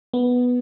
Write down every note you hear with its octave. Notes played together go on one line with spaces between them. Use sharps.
B3